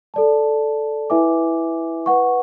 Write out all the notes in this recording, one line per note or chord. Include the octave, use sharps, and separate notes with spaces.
A4 D5 A5
E4 B4 E5 G#5 D6
B4 F#5 C#6